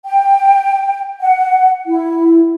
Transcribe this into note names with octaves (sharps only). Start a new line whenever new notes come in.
G5
F#5
E4